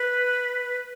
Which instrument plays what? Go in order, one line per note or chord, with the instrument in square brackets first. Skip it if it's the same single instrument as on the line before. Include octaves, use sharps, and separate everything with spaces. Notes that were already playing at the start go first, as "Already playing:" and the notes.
Already playing: [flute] B4